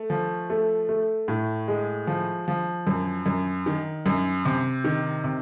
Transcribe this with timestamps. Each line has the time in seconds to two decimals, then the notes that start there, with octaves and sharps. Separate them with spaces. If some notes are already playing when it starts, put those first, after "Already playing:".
Already playing: A3
0.10 F3
0.50 A3
0.89 A3
1.28 A2
1.68 G#3
2.07 F3
2.48 F3
2.87 F#2
3.26 F#2
3.66 D#3
4.06 F#2
4.45 C3
4.84 D#3
5.24 C3